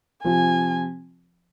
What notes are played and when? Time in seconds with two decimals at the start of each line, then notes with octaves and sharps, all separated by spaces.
0.24 C3 F3 C4 F4 G#5